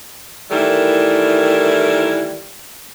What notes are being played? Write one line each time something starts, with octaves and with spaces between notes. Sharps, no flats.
D#3 E3 G3 A3 E4 A#4